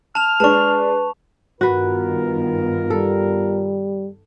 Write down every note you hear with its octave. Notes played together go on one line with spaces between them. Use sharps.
A5 F6 F7
G#3 D4 B4 A5 C#6
G2 D#3 B3 F4 F#4 A#4 B4
G3 A4